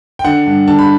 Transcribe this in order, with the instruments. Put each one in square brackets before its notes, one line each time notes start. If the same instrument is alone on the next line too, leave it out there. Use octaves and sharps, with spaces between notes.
[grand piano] G5
D3 F#5
G2
D3 A5
B5